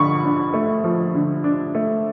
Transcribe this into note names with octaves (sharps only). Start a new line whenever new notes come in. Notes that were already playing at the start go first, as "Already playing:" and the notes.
Already playing: D3 F3 B5 C#6
D4
A3
F3
D3
D4
A3